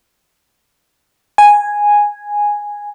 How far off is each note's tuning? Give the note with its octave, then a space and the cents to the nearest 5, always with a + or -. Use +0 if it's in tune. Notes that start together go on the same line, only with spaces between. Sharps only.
G#5 -5